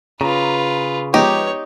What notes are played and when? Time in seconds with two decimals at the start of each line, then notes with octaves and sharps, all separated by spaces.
0.21 C#3 F4 B4 A#5
1.14 F3 G#3 B3 D#4 G4 C#5